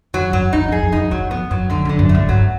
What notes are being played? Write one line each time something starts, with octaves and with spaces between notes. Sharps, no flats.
F2 F#3
F#2 F#3
E2 D#4
F2
G#4
F2
F#2 D#4
E2 F#3
F2 B3
F#2 F#3
F2 D3
F2
D3
F#2
A3
G2
G2 F#3